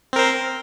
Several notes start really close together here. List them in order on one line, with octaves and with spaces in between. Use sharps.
C4 A#4 C5